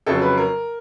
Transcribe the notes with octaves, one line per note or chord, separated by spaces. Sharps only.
F2 C#3 F#3 A4
B4
A#4